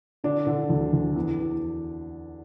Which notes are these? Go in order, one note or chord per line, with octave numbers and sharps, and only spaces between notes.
D3 D4
D3
D2
D2
E2
E2